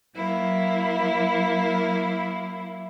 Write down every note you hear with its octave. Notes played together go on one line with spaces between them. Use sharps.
F#3 A#3 E4